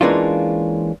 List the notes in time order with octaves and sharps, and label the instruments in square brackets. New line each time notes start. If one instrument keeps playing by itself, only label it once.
[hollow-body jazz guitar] E3 G#3 A#3 C#4 D4 F4